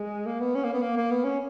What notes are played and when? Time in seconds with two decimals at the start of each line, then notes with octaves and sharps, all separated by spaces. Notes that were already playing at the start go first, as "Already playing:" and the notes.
Already playing: G#3
0.26 A#3
0.40 B3
0.55 C#4
0.64 A#3
0.73 B3
0.82 A#3
0.97 A#3
1.11 B3
1.24 C#4